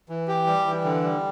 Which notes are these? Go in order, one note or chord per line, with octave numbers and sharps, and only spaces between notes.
E3
G4
G3
E3
D3
G3